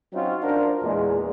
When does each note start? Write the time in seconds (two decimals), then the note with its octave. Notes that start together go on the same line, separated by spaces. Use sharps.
0.13 F#3 C4 C#4 D#4 F4 F#4
0.43 D4 F#4 A#4 C5
0.83 E2 A#2 G#3